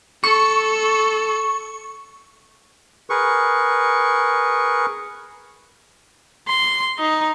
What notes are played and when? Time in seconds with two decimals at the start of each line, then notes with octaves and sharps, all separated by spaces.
0.24 A4 C#6
3.10 G#4 A#4 B4 C#6
6.48 C6
6.99 D#4